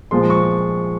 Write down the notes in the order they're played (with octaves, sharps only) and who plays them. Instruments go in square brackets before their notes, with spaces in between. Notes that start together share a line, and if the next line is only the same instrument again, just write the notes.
[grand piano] A#2 F3 G#3 C6
C#6